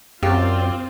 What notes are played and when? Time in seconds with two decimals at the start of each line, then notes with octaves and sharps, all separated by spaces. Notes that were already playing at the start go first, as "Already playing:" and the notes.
0.23 F#2 C4 F4 G4 D5 F5